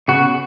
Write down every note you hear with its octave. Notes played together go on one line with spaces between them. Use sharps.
C#3 B3 F#4